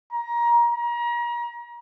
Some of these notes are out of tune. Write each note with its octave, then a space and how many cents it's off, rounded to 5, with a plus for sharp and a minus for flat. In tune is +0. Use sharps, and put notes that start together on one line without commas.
A#5 +20
A#5 +35